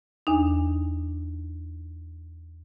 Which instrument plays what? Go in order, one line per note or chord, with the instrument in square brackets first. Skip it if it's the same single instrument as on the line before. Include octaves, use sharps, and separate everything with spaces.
[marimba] E2 D4 D#4